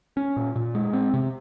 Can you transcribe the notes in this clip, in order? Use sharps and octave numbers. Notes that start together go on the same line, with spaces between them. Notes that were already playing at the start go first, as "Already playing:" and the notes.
C#4
A#2
A#2
G#3
C4
C3